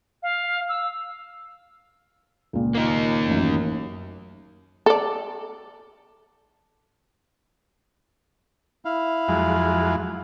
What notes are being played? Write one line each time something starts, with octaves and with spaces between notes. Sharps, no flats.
F5
E6
C#2 A#2
A#3 D#4
A1 F#2
A4 D5
E4 F5
F2 F#3 G#3